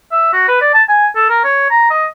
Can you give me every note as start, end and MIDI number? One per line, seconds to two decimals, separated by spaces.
0.11 0.31 76
0.33 0.44 66
0.48 0.60 71
0.61 0.72 74
0.74 0.83 81
0.89 1.06 80
1.16 1.27 69
1.30 1.40 70
1.44 1.69 73
1.70 1.89 82
1.90 2.05 75